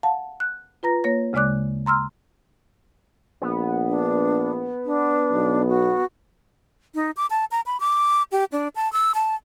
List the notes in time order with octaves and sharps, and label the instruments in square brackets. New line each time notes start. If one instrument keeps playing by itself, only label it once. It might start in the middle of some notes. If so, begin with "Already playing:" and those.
[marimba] F5 F#5 A5
F#6
F4 B4 A#5 A#6
A#3 C#5 A#6
D2 C#3 G#3 D5 D6 F#6
A#5 C6 E6 F6
[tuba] A#1 [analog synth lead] B3
[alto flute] D4
D4
[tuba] B1
[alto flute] F#4
[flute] D#4
D6
A5
A#5
B5
D6
G4
D4
A5
E6
A5